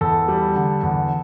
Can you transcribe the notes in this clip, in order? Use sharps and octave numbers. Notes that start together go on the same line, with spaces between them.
E2 A4
G3
D3
E2